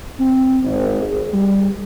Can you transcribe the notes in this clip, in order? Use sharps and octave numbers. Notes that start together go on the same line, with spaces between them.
C4
G#1
G#4
G3